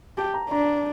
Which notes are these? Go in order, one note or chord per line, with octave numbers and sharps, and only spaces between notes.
G4 A5
A#5
D4 A#5